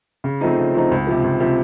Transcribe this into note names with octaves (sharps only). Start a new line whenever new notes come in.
C#3
F3 A3 C4 D#4
C#3
F3 A3 C4 D#4
C#2
C3 F3
C#2
C3 F3